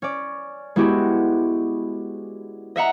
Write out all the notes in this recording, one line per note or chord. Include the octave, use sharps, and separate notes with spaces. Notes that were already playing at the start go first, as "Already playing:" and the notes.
C#4 D5
G#3 B3 E4 F#4 G4
D#5 E5 F#5 A#5